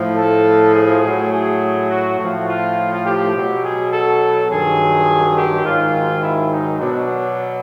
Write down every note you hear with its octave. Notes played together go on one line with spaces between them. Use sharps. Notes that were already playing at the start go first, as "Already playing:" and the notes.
Already playing: A2 F3
A4
G#4
A2 F#3
G#4
F#4
A2 F3 F#4
F4
G4
B2 F#3
G#4
A4
G2 D#3 F#3 G#4
G4
G#2 D#3 F#3 F4
E4
D#4
B2 F#3 D4